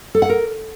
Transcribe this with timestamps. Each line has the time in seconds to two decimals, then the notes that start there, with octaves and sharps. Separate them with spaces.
0.15 A4
0.22 F#5
0.29 A#4